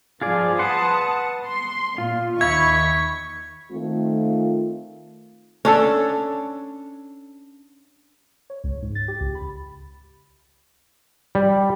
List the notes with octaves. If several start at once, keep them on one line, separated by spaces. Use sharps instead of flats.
G2 F3 F4 G#4 D5
B4 F#5 A5 C6 D#6
C6
A#2 F4
D#2 D#3 E5 B5 C#6 G#6
D#3 A3 C4 F4
C#4 D4 A4
C#5
C#2
G#2
A6
G4
C#2
B5
G3